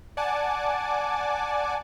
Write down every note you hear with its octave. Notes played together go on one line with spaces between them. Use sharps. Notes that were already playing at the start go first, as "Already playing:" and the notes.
D5 F#5 G#5 A5 D6